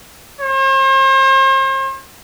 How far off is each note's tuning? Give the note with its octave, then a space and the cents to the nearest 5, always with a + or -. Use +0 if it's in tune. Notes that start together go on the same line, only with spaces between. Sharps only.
C5 +40